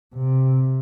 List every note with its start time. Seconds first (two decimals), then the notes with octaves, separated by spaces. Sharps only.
0.15 C3